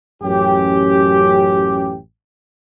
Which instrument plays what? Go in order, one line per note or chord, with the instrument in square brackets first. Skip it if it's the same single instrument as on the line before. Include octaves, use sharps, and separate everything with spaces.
[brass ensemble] A1 F#2 C#4 G4